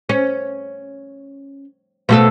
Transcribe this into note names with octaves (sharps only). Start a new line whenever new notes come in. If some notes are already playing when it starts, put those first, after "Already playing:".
C#4
B2 A3 A4